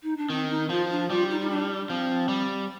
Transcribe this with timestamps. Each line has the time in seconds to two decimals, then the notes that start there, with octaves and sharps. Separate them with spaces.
0.03 D#4
0.17 D4
0.30 D#3 C4
0.50 D#4
0.70 F3 F4
0.90 D4
1.10 G3 F4
1.30 D#4
1.40 D#4
1.50 D4
1.89 F3 C4
2.29 G3